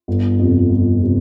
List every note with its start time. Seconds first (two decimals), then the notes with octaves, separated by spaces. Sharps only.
0.08 G1
0.39 F2 C3
0.69 G1
1.02 C3